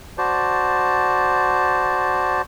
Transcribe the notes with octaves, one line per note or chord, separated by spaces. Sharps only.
F#4 C5 D5 A5